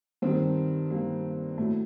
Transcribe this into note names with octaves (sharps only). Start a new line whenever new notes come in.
G2 D#3 G3 C4
G2 D#3 G3 A#3
A2 F#3 A3